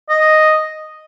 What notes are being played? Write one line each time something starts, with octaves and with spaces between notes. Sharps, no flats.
D#5